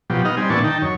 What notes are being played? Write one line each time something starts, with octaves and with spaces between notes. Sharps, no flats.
B2 F3 F#3 G4
B3 D#4 D#5 F6
G3 C4 G#5
A#2 E3 B3 D4 A5 C#6
D#3 D#4 G5 A5
F#2 C#5